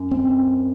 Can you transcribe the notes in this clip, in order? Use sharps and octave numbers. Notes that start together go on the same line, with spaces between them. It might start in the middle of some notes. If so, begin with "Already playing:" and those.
Already playing: F#2
C4